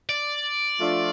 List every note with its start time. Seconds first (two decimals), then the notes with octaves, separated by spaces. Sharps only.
0.09 D5
0.79 F3 A3 D4 F4